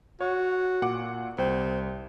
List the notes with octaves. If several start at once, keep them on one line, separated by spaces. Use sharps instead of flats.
F#4 C#5
A#2 F#5 D6
C2 C4